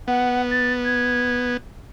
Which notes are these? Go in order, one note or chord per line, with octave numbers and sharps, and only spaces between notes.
B3 F#5
A6
G#6